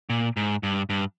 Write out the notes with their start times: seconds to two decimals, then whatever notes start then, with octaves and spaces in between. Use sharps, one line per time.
0.10 A#2
0.37 G#2
0.63 G2
0.90 G2